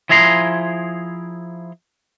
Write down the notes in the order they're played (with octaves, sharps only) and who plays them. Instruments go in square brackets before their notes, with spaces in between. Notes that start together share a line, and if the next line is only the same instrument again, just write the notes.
[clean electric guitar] F3 E4 G#4 A#5 C6